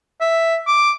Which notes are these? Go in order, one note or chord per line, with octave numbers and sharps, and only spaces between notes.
E5
D6